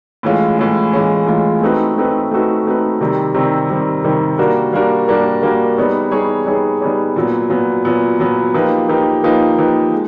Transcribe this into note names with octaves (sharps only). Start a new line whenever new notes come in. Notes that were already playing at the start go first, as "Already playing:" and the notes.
A2 E3 G#3 C#4 F4
A2 E3 G#3 C#4 F4
A2 E3 G#3 C#4 F4
A2 E3 G#3 C#4 F4
A3 C4 D#4 F#4 B4
A3 C4 D#4 F#4 B4
A3 C4 D#4 F#4 B4
A3 C4 D#4 F#4 B4
C3 D#3 G3 C4
C3 D#3 G3 C4
C3 D#3 G3 C4
C3 D#3 G3 C4
G3 A#3 D4 F#4 A#4
G3 A#3 D4 F#4 A#4
G3 A#3 D4 F#4 A#4
G3 A#3 D4 F#4 A#4
G3 B3 D#4 G#4 C#5
G3 B3 D#4 G#4 C#5
G3 B3 D#4 G#4 C#5
G3 B3 D#4 G#4 C#5
A#2 F#3 B3
A#2 F#3 B3
A#2 F#3 B3
A#2 F#3 B3
F3 A#3 D#4 G4 B4
F3 A#3 D#4 G4 B4
F3 A#3 D#4 G4 B4
F3 A#3 D#4 G4 B4
G#3